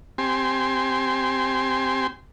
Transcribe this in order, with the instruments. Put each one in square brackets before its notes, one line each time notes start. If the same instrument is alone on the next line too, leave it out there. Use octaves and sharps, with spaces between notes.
[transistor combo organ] C4 G4 G#5 C6